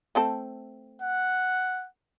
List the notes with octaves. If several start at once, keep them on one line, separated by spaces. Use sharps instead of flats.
A3 C4 A4
F#5